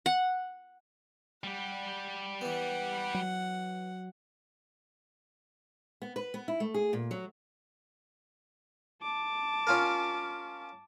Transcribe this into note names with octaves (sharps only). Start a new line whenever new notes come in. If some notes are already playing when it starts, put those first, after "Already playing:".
F#5
G3 G4 F#5
E3 B3 F#5
F#3
B3
B4
B3
E4
A3
G#4
A#2
F#3
A5 D6
C#4 F4 A#4